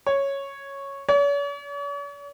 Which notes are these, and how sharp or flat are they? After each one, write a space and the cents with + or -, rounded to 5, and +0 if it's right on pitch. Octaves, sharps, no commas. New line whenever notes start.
C#5 -5
C#5 +45